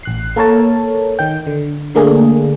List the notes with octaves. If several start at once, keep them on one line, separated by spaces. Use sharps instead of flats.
A1 F#6 C7
A#3 A4 A#4 C#5 A5
D#3 G5
D3
D3 A3 A#3 D4 G#4